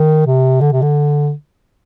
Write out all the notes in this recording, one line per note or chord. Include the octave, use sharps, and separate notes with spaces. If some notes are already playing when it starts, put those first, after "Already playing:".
Already playing: D#3
C3
D3
C3
D3